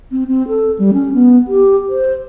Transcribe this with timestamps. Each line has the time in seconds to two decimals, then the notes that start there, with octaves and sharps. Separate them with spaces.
0.11 C4
0.28 C4
0.48 A4
0.79 G3
0.93 C#4
1.14 B3
1.47 G4
1.89 C5